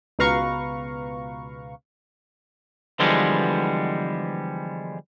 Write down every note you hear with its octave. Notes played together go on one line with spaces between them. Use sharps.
C#2 B2 B4 F5 A#5 C#6
D3 E3 F3 G3 G#3 B3